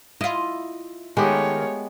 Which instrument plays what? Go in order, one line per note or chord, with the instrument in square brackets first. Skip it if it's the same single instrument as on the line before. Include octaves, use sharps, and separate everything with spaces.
[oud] E4 F4 [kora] D#5
[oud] D#3 [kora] G#3 B3 G4 [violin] A3 C#5